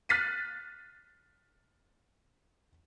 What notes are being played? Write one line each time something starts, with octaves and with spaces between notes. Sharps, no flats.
F6 F#6 A6 B6 C7 D#7